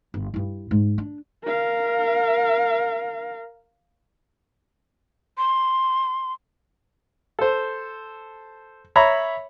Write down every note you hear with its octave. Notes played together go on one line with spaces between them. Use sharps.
G1
G2 E4
G#2
D4
A#4 F5
C6
A4 C5
C#5 E5 A#5 B5